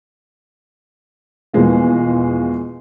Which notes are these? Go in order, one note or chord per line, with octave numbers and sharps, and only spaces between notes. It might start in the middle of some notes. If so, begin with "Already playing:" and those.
E2 B2 E3 F3 G#3 A#3